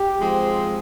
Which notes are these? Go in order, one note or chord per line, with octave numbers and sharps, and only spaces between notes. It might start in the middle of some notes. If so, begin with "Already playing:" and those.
Already playing: G4
F3 G#3 C4